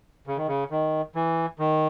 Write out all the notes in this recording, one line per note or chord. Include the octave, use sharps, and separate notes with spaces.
C#3
D#3
C#3
D#3
E3
D#3